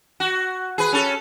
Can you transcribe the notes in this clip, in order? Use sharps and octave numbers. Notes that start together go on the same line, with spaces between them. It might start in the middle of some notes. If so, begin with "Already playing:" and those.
F#4
G#4 B4
C#4 A4